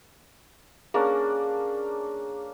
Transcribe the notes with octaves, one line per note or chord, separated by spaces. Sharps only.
A#3 C#4 D4 G#4